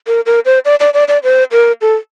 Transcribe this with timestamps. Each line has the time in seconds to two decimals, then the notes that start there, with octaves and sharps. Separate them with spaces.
0.07 A#4
0.26 A#4
0.45 C5
0.65 D5
0.80 D5
0.94 D5
1.08 D5
1.24 C5
1.52 A#4
1.81 A4